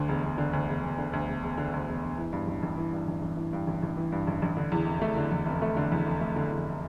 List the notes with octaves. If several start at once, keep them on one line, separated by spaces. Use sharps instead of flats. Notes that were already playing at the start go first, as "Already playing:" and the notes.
Already playing: D2 D3
E1
E1
D3
D2
E1
E1
D3
D2
E1
E1
D3
D2
E1
E1
E3
G2
A1
A1
E3
G2
A1
A1
E3
G2
A1
A1
E3
G2
A1
A1
D3
E2
F1
A3
D3
E2
F1
A3
D3
E2
F1
A3
D3
E2